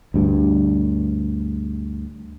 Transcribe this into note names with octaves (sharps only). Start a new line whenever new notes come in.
D2 G2